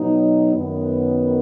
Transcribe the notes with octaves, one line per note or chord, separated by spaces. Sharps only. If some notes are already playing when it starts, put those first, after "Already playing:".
Already playing: B2 F#3 B3 D#4
F#2 D#3 B3